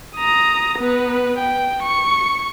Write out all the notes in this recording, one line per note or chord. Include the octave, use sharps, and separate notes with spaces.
A#5 D#6
B3 B4
G5
C#6